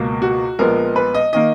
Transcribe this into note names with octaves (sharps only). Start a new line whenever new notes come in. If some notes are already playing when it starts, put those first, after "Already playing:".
Already playing: C#2 B2 A#3
F#4
A#1 A#2 G#3 B3 A#4
B4
D#5
D#3 A#3 D#5